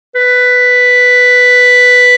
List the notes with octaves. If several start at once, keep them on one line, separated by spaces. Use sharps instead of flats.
B4